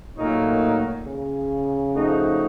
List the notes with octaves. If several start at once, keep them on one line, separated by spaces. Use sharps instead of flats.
A#2 F#3 A3 D#4 A#4 C#5
C#3
F3 A3 D#4 F#4